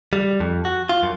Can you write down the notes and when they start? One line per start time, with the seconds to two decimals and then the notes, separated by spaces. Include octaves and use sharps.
0.13 G3
0.40 F2
0.65 F#4
0.89 F4
1.03 F#2